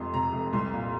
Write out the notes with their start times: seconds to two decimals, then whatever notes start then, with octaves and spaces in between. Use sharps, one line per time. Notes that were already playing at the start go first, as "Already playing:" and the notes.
Already playing: F1 F2 C6
0.14 C3 A#5
0.33 F1
0.53 C2 C6
0.73 A#2